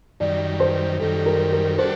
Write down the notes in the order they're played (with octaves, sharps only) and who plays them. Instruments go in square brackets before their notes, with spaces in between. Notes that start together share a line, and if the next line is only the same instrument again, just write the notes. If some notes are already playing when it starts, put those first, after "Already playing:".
[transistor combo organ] F#2 D#3 G3 [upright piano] D5
[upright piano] C5
[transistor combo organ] F#2 D#3 G3 [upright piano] A4
[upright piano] A#4
A#4
[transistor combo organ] G3 D4 F#4 A4 [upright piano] C5